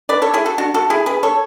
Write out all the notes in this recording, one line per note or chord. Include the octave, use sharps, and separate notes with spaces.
B4 D5
A4 C#5
E4 G#4
F#4 A4
D4 F#4
F#4 A4
E4 G#4
G#4 B4
A4 C#5